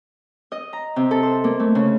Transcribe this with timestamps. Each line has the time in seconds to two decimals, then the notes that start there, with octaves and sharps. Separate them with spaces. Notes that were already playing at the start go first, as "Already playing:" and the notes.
0.52 D#5
0.73 A#5
0.96 C3
1.11 A4
1.23 C5
1.44 A#3
1.60 A3
1.75 C#3